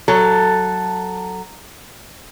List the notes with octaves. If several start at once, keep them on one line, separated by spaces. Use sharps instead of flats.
F#3 A4